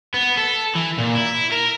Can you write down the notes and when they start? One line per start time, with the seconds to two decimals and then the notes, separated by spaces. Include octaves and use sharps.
0.14 B3
0.37 A4
0.75 E3
0.98 A#2
1.15 E4
1.52 A#4